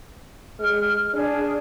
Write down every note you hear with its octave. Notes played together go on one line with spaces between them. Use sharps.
G#3 F6
D4 G#4